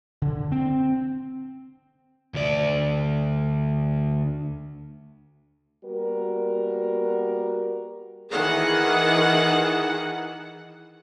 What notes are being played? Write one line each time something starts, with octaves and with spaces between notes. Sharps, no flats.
D3
C4
D2 D5
G3 A#3 B3 F#4 A#4
D#3 E3 G#4 F#5